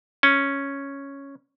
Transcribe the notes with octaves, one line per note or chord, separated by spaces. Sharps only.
C#4